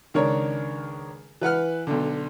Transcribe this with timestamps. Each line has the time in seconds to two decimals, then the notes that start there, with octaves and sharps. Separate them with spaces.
0.14 C#2 D#3 D4 A#4 C#5
1.41 E3 B4 F#5 F6
1.87 B1 D3